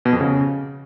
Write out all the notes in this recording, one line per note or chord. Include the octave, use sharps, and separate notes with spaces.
B2
F2
C#3